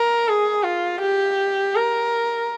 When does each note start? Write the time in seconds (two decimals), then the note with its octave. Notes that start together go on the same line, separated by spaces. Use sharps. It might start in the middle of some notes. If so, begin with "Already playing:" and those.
Already playing: A#4
0.28 G#4
0.65 F4
1.01 G4
1.75 A#4